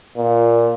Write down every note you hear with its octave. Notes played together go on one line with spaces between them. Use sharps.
A#2